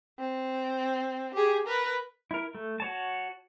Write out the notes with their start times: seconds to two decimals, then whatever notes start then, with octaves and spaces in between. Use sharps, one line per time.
0.19 C4
1.34 G4 G#4
1.67 A#4 B4
2.31 E4 A#4
2.55 A3
2.80 F#4 C#5 A5